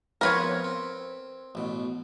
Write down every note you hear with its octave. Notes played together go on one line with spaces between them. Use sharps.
F3 B3 C4 A#4 B4 C#5
C4
A1 B2